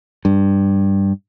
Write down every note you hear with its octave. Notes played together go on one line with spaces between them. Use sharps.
G2